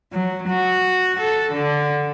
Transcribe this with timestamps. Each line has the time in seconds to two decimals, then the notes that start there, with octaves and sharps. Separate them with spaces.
0.12 F#3
0.49 F#4
1.19 A4
1.52 D3